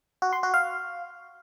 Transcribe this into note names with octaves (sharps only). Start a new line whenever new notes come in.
F#4
C6
F#4
F5